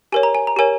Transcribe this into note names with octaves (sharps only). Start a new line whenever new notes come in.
G4 A#4 C#5 G#5
A#5
G#5
A#5
G4 A#4 C#5 G#5